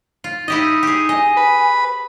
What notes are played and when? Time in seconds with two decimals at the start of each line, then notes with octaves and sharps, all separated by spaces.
0.24 F4
0.48 D#4 E4 G4 D#5
0.83 G4 G#4
1.09 D#5 G#5
1.37 B4 B5